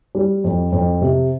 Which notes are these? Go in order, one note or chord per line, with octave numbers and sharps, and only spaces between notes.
G3
F2
F2
C3